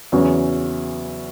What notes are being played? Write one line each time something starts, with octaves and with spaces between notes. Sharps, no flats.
E2 C#3 F#3 C#4 F#4